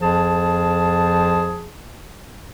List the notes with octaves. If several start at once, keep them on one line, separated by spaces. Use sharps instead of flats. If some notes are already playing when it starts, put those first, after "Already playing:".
F2 F3 G#4 A5